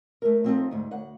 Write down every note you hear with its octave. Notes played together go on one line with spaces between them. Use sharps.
A3 A#4
F3 G3 C4 D4 D#4 A4
D2 G#2
D2 F#5